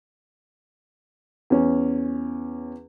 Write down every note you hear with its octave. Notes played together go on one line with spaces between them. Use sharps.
E2 C#4